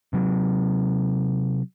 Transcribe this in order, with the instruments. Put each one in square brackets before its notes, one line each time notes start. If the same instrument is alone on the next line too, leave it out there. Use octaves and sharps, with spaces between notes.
[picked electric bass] C3 F#3